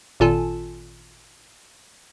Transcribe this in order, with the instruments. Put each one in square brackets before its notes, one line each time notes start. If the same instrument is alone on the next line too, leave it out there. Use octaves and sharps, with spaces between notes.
[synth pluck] G#1 A#2 F4 A4 G#5 A5